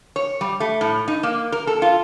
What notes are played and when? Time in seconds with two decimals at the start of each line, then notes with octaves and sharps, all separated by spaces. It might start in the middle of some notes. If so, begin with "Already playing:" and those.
0.16 C#5
0.41 G3
0.60 A3
0.81 A2
1.08 D#4
1.23 A#3
1.52 A#4
1.67 A4
1.82 F4